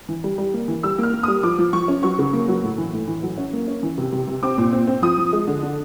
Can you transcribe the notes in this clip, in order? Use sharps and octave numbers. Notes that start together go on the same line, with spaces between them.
E3
G3
G3
A#3
E3
G3 E6
A#3 F6
A#3
D#6
G3
F3 D6
F3
F3 C#6
C#4
F#3 C#6
C#3
A#3
F#3
A2
E3
A2
E3
F#3
C#4
A#3
C#4
E3
C3
C3
C3
C4 D6
A#2
C4
C4
F3 D#6
F3
G#3
D3
D4